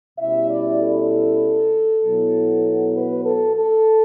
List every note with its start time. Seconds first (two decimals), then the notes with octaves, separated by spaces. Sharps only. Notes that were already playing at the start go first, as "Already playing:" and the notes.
0.18 B2 G3 C#4 E4 E5
0.48 D5
0.79 A4
2.02 B2 F#3 B3 E4
2.94 B4
3.24 A4
3.55 A4